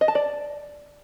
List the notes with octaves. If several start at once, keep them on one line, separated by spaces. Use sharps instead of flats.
D#5
A5
D5